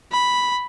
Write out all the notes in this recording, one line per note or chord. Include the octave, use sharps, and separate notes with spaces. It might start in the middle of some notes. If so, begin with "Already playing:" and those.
B5